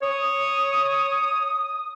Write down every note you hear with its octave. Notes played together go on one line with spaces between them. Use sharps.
C#5 D#6